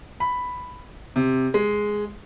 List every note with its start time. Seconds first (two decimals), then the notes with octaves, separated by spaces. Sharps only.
0.20 B5
1.16 C3
1.54 G#3